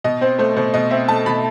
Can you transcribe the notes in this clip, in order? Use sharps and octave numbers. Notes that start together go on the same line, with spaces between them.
B2 D#5
C4 C5
A3 C5
B2 C5
B2 D#5
C4 E5
A3 A5
B2 B5